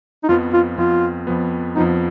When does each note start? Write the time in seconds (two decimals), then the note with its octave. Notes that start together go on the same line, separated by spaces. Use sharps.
0.24 D#4
0.29 F2 F3 B3 F4
0.54 F4
0.77 F2 F3 B3 F4
1.27 F2 F3 B3
1.76 F2 F3 B3 D#4